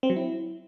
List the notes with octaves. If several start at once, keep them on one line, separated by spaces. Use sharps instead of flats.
C4
F#3
E4